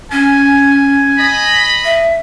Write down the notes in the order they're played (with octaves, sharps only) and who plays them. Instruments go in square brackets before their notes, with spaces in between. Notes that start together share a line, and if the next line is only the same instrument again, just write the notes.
[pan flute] C#4 [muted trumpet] G#5
[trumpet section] D#5 B5
[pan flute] E5